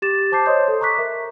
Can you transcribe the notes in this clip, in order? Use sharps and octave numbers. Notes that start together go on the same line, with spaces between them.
G4 D6 A6 E7
C5 A5 D6 G6 C7
C5 C#5 D#5 C6 D#6 G6
A4
A#5 C#6 D6 F#6 B6
A#4 E5